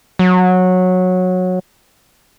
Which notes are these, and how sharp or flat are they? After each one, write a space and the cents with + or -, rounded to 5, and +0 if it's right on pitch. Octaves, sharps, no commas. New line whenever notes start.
F#3 -15